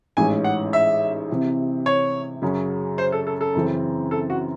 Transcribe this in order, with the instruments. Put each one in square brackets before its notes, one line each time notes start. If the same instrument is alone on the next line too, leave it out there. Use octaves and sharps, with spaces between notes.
[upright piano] A1 G#2 E3 G#3 C#4 [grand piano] G#5
[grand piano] F#5
E5
[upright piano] C3 E3 C4 E4
[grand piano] C#5
[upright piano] F#2 C#3 F#3 C#4 G#4
[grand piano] C5
A4
A4
A4
[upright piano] F#2 C#3 E3 C4
[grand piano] A4
F#4